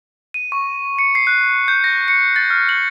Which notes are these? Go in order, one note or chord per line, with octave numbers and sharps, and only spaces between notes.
D#7
C#6
C#7
C7
F#6
G6
A#6
C#7
A6
F6
F#7